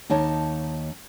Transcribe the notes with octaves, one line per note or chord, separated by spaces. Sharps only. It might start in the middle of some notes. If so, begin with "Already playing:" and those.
D#2 D#4 C#5 A5